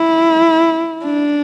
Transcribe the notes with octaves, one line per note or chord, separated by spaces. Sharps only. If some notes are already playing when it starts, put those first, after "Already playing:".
Already playing: E4
D4